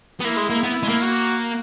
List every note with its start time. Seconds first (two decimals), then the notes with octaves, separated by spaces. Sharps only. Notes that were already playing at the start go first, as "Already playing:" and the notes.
0.21 B3
0.24 A#3 E4
0.37 G#3
0.50 A#3
0.63 B3 E4
0.83 G#3
0.89 A#3
1.02 F#4